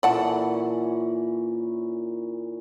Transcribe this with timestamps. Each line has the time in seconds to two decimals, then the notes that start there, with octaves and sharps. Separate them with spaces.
0.03 A#2 E3 C#4 D5 F#5 A5